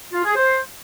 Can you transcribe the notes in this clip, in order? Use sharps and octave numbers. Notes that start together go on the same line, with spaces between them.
F4
G#4
C5